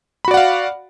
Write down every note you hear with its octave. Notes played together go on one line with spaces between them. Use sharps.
F#4 D5 F5 F#5 B5